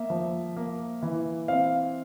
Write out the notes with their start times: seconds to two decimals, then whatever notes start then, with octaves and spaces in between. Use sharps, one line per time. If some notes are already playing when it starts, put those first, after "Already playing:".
Already playing: A#3 E5
0.10 F3
0.57 A#3
1.03 E3
1.48 C4 F5